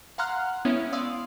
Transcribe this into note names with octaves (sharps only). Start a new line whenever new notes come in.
F5 F#5 A#5 C6 F6 F#6
G#3 B3 C#4 E4 C#5 E5
D5 F5 C6 D#6 E6